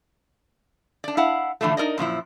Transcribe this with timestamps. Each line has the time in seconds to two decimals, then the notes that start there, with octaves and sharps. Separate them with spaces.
1.04 D4 D5
1.17 E4 F5 F#5
1.61 A2 D3 E3 F3 A3
1.77 D#4 A#4 D5 D#5
1.98 F#2 A#2 F3 E4